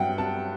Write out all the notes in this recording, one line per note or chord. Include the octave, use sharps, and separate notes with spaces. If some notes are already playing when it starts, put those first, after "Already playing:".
Already playing: G2 F#3 E5 F#5 G5
A5